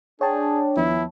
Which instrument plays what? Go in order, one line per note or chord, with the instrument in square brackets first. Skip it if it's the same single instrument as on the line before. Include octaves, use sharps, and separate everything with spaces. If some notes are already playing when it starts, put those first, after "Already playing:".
[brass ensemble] D4 [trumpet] G#4 [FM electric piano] C#5 G5 A5
[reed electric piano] D#2 F3 B3 [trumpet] E4